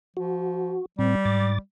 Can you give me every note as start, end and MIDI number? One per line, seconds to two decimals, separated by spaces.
0.17 0.76 53
0.17 0.86 66
0.99 1.15 45
0.99 1.58 55
0.99 1.15 60
1.25 1.58 44
1.25 1.58 86
1.25 1.58 93